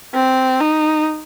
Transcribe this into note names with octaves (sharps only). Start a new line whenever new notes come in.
C4
D#4